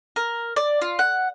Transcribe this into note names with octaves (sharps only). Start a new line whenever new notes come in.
A#4
D5
F4
F#5